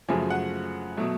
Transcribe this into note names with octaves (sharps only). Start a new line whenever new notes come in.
F#2 C#3 F3 A3 G#5
F#5
B2 F#3 A3